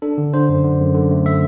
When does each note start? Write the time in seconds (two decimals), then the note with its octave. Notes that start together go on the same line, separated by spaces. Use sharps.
0.02 D4 A4
0.18 D3
0.34 D3 C5
0.49 F#2
0.65 D3
0.80 F#2
0.95 D3
1.11 A3
1.26 E5